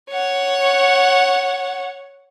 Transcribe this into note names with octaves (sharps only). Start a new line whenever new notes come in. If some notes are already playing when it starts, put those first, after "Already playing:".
C#5 F#5